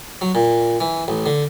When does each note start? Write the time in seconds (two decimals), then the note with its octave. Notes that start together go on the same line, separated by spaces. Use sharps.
0.21 F#3
0.35 A#2
0.81 E3
1.08 A1
1.26 D3